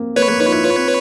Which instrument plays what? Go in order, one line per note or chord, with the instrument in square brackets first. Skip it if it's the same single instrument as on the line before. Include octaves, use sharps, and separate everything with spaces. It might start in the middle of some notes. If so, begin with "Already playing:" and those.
Already playing: [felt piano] A#3 C4
[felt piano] A#3 [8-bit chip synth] B4 C#5
[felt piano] A#3
D#4
F4
E4
F4
C4